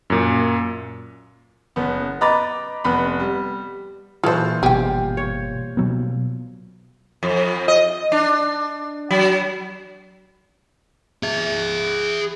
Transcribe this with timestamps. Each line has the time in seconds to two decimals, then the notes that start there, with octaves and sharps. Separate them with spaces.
0.10 F#2 A#2
1.76 F#1 B3
2.21 B4 D#5 A#5 B5 D6 A6
2.84 F1 B3 B5
3.20 G3
4.24 A#2 E3 F4 F#4 G#4 A4 C5
4.63 G1 G2 B2 G4 G#4 G5
5.17 C#5
5.77 B2 F#3 B3
7.23 F2
7.68 D#5
8.12 D4
9.11 F#3
11.23 G#4 E5